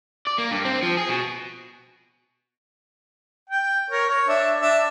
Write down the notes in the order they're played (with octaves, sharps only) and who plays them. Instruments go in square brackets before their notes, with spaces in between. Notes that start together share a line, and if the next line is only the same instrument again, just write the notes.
[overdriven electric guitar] D5
A#3
G2
C4
F3
G#4
B2
[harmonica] G5
A#4 C#5
C#5
D4 E5
D4 E5